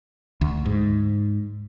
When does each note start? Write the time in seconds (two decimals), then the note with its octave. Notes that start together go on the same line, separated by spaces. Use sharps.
0.41 D2
0.66 G#2